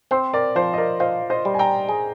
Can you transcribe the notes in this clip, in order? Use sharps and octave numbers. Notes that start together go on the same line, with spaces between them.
C4 C5
A#4 D5
F3 C5
D#5
A#4 D5
F4 C5 D#5
C5 D#5
G3
G#5
G5 A#5
G#4